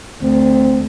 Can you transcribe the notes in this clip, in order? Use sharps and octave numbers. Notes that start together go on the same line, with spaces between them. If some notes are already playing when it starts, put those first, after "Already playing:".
D2 C4